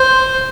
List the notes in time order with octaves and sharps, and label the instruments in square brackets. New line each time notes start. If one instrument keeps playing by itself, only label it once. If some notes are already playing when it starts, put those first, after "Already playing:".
Already playing: [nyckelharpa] C5